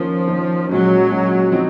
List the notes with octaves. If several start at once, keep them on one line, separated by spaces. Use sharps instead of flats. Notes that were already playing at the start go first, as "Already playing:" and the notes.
Already playing: D#3 F3 A#3 C#4
D#3 A#3 C#4
A#2 F#3 G#3 C#4
A#2 G#3 C#4
F3 C4 D#4